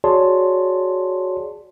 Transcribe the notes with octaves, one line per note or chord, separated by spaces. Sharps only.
F#4 G#4 C#5 D5 A5 C6